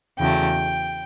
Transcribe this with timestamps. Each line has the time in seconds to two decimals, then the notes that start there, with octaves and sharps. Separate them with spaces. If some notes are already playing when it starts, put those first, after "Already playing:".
0.18 E2 C#3 F#3 A3 G5